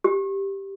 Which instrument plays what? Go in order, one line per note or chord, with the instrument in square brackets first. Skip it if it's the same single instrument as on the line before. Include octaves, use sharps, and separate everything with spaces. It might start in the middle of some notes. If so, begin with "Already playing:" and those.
[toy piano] G4